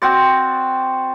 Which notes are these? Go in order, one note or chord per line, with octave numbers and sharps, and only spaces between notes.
C4 F#4 C5 D5